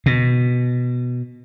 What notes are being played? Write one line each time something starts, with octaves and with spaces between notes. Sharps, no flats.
B2